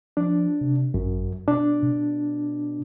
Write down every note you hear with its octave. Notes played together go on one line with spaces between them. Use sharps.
F3 D4
C3
G#1 F#2
B2 D4
B2